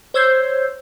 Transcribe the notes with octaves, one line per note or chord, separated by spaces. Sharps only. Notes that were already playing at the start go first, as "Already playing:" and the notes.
C5 C#5 E6 G6 G#6 C7